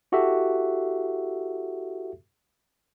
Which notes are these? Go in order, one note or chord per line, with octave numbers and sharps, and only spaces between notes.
E4 F#4 G4 A4 E5